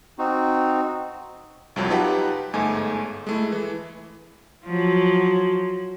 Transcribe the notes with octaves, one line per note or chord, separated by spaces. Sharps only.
C4 D#4 F#4
C2 F2 F#3
D#4 F4 G4 B4 F#5 A5
G1 G#2 A3 G#5
G#3 A3 E4
E3
F3 F#3